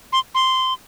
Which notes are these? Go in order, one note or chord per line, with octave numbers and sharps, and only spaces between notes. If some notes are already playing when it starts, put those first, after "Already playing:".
C6
C6